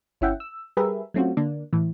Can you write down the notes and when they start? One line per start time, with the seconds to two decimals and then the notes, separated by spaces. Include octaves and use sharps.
0.21 G1 C#4 E4 E5 F#5 G5
0.40 E6
0.77 G3 G4 G#4 A#4 B4 E5
1.14 F#3 A3 C4 C#4 F4 F#4
1.37 D3 A#3 D4
1.73 A2 E3